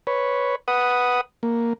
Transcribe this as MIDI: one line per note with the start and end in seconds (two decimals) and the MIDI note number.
0.07 0.56 71
0.07 0.56 73
0.68 1.21 71
0.68 1.21 78
0.68 1.21 87
1.43 1.73 58